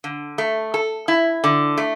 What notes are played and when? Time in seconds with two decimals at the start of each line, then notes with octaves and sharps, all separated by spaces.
0.04 D3
0.38 A3
0.74 A4
1.08 E4
1.44 D3
1.78 A3